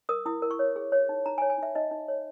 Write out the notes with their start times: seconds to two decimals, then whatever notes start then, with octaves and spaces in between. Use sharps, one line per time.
0.09 A#4 D#6
0.26 E4 D#6
0.42 A#4
0.51 C#6
0.59 C#5
0.76 G#4
0.92 C#5
1.09 D#4
1.26 D#4 A#5
1.38 G#5
1.42 C#5
1.50 G#5
1.58 D#4 E5
1.75 D#4 D#5
1.91 D#4
2.08 C#5